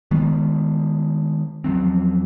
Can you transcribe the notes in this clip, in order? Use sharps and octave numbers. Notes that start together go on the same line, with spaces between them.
D#3 G#3 B3
E2 F3 F#3 C4